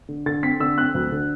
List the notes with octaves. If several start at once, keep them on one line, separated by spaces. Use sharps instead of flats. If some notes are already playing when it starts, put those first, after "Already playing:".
D3
D3 A6
C4 B6
D3 E6
C4 F#6
D2
D3